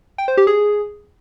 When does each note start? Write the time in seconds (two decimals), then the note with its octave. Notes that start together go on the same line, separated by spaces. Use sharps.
0.18 G5
0.28 C5
0.37 G4
0.47 G#4